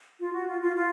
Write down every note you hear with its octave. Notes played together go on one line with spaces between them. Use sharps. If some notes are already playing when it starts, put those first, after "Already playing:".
F4
F#4
F4
F4
F4